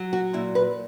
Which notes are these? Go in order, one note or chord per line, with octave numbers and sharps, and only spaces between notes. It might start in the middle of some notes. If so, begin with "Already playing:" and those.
Already playing: F#3
F#4
A#2 E4
B4